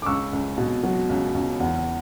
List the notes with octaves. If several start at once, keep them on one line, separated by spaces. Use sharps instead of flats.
D6
C#2 C#6 E6
C#2
B2
F#3
C#2
C#2
E2